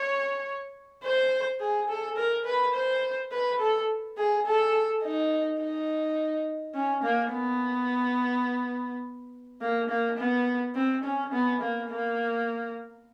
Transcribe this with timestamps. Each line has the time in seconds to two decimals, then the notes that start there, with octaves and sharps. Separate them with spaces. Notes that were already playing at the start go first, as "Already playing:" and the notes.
Already playing: C#5
1.03 C5
1.60 G#4
1.89 A4
2.17 A#4
2.45 B4
2.74 C5
3.32 B4
3.60 A4
4.18 G#4
4.46 A4
5.04 D#4
5.60 D#4
6.74 C#4
7.03 A#3
7.32 B3
9.61 A#3
9.89 A#3
10.18 B3
10.75 C4
11.04 C#4
11.33 B3
11.61 A#3
11.90 A#3